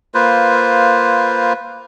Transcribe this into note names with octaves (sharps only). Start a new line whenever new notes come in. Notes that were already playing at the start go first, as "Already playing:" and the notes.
A#3 F4 B4 C5